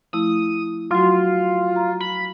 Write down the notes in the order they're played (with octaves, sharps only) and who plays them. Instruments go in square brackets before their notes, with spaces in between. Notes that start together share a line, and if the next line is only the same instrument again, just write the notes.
[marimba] F3 A3 E4 [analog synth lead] D#6
[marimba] F#3 F#4 [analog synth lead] F4
[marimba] A#5
[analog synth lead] B5